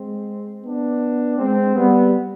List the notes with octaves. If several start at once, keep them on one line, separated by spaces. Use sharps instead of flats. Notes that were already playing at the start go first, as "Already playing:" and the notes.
Already playing: G#3 C4
B3 D4
G#3 C4
G3 B3